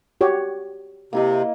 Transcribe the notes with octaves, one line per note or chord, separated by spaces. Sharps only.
F#4 G4 C#5
C3 A#3 E4 D#5